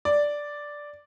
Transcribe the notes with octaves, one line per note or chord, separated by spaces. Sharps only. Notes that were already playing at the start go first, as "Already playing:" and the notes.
D5